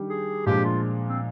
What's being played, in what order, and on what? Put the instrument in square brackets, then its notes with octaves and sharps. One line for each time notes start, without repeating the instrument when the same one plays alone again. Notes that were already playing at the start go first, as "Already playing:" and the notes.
Already playing: [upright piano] D#3 G3 D4 G4
[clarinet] G#4
[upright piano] A#2 F3 G#3 D4 [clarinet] G4
[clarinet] F4
C4